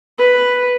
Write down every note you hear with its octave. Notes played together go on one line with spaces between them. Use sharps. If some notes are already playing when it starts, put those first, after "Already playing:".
B4